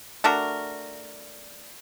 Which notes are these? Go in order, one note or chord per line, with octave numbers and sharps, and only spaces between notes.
A3 D4 F#4 A#4